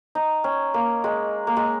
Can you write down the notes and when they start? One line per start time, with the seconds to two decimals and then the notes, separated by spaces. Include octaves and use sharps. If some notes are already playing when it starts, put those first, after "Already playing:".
0.15 D#4
0.44 C#4
0.74 A#3
1.04 G#3
1.47 A#3
1.56 G#3